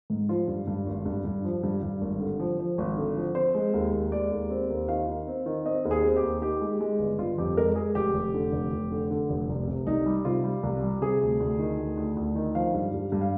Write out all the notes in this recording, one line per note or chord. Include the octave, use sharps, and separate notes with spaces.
G#2
F3 F4
G2
G2
G#1
G2
G2
F3
G2
G2
G#1
D3
F3
F3
G#1
D3
F3
C4 C5
G#3
D#2
D#2
G#3 D5
D#2
C4
D#2
D#3 F5
D#3
C4
D#3
C4 D#5
D#2
G#4
C4
G4
D#2
D#3 G4
G#3
G#3
G1
G1 F4
F2 G4
G#3 A#4
G#3 G#4
F1 G4
F1
D3
F1
F1
D3
D3
F1
C2
C3
C2 D#4
G3
C3 F4
G3
C2
G3
C3 G#4
D2
D2
D#3
D2
D2
D2
D#3
F3 F5
G2
G2
G2
F5